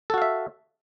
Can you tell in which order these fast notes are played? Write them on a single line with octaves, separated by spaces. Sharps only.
A4 F#4 F5 E5